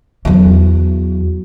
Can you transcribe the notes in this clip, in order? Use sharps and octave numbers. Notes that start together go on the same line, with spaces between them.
E2 F#3